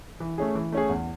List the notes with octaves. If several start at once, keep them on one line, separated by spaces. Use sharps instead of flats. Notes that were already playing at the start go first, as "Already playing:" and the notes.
E3
A3 C#4 G#4
E3
A3 C#4 G#4
E2